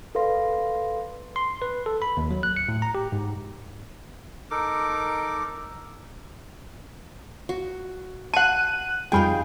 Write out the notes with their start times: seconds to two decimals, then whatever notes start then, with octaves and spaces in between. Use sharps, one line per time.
0.15 A4 B4 D5 F5 C6 A#6
1.36 C6
1.62 B4
1.86 A4
2.02 B5
2.17 D#2
2.31 F#3
2.43 F#6
2.56 C#7
2.68 A2
2.82 A#5
2.95 G4
3.12 G#2
4.51 D#4 A4 A#4 D6
7.49 F#4
8.34 F#5 A5 C#6 F#6 D#7
9.12 F2 G3 D#4 F4 G#4 G5 G#5 B5